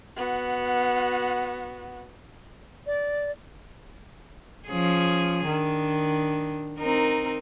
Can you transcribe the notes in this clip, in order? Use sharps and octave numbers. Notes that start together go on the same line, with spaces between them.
B3 F#4
D5
F3 C#4 G#4
D#3 D4
C4 D#4 A#4